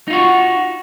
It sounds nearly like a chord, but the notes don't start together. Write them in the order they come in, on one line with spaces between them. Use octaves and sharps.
D#4 F4 F#4